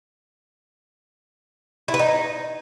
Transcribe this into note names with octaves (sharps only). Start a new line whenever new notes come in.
E4
B4
D#4